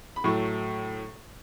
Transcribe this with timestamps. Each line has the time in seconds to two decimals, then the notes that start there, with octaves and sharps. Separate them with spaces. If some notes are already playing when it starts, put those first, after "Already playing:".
0.16 B5
0.24 A2 F#3 A3 C#6